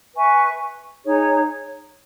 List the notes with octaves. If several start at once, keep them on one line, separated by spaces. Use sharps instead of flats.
B4 E5 G#5 C#6
D#4 G#4 C#5